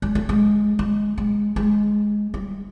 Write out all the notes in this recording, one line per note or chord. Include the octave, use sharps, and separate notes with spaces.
G#3
A3
G#3
G#3
G#3
G#3
G3